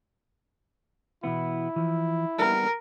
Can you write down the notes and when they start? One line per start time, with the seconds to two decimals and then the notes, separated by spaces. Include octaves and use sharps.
1.24 B2 E3 B3 E4
1.76 E3 F3
2.38 G3 B3 A#4